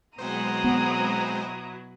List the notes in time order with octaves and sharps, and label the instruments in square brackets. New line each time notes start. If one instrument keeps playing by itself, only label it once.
[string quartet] B2 F#3 E4 [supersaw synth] G#3 C4 C5 [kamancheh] A#5 D#6
[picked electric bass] B3